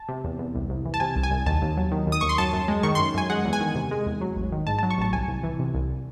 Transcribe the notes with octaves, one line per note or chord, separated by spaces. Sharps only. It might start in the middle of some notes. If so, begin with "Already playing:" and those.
Already playing: A5
C3
E2
E2
C2
C2
E3
A5
C3 G#5
C2
G#5
C2
D#2 A5
D#2
F#3
D#3
D#2
D#6
D#2 C#6
C6
F#2 A5
F#2
G#3
D#3 C#6
F#2 C6
F#2 G#5
G#3 F#5
E2
G#5
D#3
C3
G#3
E2
F#3
A1
D#3
G#2 A5
F#3 A5
C#6
A1 A5
C2 G#5
C2
E3
C3
C2